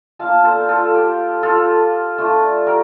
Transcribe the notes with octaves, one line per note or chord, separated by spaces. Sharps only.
A#3 D4 F4 F5 A5
A4 C5
F4 A4
G4
F4 A4
A3 D4 F4
G4 A#4